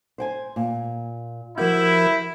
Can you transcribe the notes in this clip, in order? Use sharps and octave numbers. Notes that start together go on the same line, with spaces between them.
C5 G5 G#5
A#2
F3 E4 F#4 G4 A#4 G6